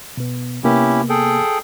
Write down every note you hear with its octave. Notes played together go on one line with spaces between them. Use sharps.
B2 B3
C3 A#3 B3 C#4 E4 G4
G#4 A4 G5